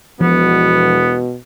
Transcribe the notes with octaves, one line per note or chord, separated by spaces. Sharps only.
E1 B2 F3 B3